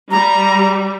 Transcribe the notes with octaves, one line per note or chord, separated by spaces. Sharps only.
G3 A#5